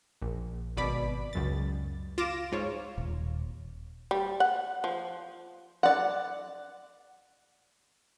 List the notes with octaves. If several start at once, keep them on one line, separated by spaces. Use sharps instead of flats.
A#1
G#1 B2 D5 B5 D6 B6
C#2 F#2 A6
F4 D6 A#6 E7
G#2 F4 C#5
D#1
G3
F#5
F3
D5 F#5